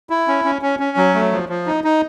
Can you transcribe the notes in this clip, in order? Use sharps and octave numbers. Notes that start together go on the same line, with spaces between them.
E4
C#4
C#4
C#4
C#4
F#3
A3
F3
F3
D#4
D#4